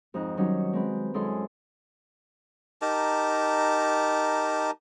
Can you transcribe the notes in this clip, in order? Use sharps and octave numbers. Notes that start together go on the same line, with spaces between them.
F2 G#2 D#4 F#6
D#3 F#3 G3 C#4 D#4
G#3 C4 B4
F#2 G#3 E4 G#4 A4 C6
D#4 G4 A#4 A5